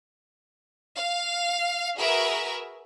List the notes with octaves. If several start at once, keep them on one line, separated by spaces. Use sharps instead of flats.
F5
F#4 G#4 A#4 B4 E5